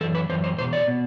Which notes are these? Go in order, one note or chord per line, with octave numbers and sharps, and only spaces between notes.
F#2 E3 A4
B4
F#2 E3 C5
C5
E2 B2 C5
D5
B2